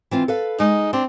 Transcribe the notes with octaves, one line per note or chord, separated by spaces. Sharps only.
E3 C4 F4
A4 B4 F5
G#3 D#4
C4 D4